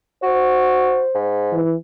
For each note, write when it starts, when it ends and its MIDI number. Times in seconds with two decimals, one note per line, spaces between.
0.23 1.04 66
0.23 1.25 72
1.14 1.59 44
1.52 1.74 52